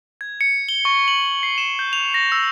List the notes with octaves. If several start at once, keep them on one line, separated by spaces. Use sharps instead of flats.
G#6
C#7
G7
C#6
F#7
C7
E7
G6
F7
A#6
E6